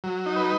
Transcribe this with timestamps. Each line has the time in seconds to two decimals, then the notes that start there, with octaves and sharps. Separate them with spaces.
0.04 F#3
0.26 D#4
0.36 B4